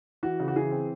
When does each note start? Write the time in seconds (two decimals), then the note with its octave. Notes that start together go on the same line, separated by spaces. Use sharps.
0.23 E3 F#4
0.40 C#3
0.48 F#4
0.56 E3 G#4
0.71 C4